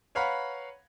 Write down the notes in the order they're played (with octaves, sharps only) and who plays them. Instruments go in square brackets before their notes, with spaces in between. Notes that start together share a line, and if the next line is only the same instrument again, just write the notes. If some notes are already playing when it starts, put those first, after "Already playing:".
[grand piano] B4 C#5 F5 F#5 A#5 B5